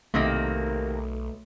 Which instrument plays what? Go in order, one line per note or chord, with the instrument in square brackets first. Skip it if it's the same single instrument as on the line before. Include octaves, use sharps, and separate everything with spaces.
[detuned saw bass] B1 [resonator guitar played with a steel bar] C3 D#3 A#3 [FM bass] A3